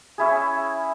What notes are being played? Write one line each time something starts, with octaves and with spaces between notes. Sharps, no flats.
C#4 E4 G#4